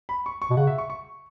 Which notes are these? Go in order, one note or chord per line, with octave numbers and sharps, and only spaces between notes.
B5
C#6
C#6
B2
C#3 F#5
E5
C#6
C#6